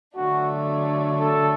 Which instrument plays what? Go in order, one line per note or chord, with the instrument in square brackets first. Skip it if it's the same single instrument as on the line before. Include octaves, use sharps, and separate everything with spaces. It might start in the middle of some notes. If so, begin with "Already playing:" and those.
[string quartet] D3 F#3 A3 D4 [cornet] F#4
[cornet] A4